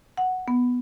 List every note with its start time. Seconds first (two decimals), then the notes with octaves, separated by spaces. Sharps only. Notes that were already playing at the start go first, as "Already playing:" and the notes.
0.17 F#5
0.48 B3